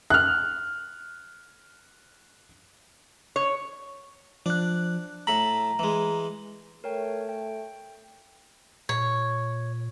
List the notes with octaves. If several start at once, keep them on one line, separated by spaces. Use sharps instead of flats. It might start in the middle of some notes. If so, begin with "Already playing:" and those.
F6 F#6
C#5
F3 D4 F#6
A2 A4 A#5 B5
E3 G#3
A3 A#4 C#5 G5
G5
A#2 C#5